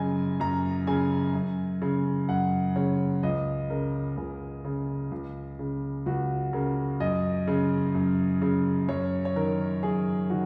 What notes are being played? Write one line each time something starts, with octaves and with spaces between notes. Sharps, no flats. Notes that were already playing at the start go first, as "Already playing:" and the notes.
Already playing: F#2 C#3 D#5 G#5
F#2 A#5
C#3 G#5
F#2
C#3
F#2 F#5
C#3 C#5
C#2 D#5
C#3 A#4
C#2 G#4
C#3
C#2
C#3
C#2 F#4
C#3 A#4
F#2 D#5
C#3
F#2
C#3
F#2 C#5
C#5
D#3 A#4
F#2 G#4
D#3 F#4